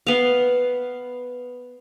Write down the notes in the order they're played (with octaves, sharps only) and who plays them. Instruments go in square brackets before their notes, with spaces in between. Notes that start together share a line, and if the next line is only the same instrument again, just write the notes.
[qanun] B3 F5